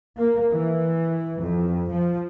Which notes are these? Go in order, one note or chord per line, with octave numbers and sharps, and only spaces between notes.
A#3
E3
F2
F3